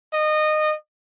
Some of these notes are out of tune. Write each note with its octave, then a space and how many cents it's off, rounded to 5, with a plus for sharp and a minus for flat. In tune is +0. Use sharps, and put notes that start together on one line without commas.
D#5 -20